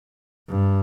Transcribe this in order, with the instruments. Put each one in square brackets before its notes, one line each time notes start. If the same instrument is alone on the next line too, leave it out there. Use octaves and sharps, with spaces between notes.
[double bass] G2